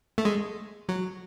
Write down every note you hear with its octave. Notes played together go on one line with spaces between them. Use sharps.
A3
G#3
F#3